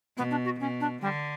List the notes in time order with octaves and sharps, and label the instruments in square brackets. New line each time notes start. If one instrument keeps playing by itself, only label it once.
[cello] B2 [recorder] B3
[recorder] D4
F#4
[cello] B2 [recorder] C#4
[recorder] D4
[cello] D3 [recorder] G3